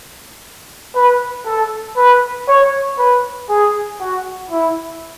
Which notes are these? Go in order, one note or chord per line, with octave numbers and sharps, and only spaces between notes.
B4
A4
B4
C#5
B4
G#4
F#4
E4